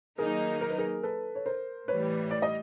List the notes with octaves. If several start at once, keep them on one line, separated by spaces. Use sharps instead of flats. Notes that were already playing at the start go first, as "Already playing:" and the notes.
D#3 F#3 A#3 D#4 G#4 A#4
A#4
B4
G#4 A#4
A4 B4
C#5
A#4 C5
A2 E3 G3 B4 C#5
D5
D#5